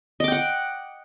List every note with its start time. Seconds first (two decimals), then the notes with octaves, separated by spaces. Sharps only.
0.20 D#5
0.24 D6
0.28 G5
0.32 F#5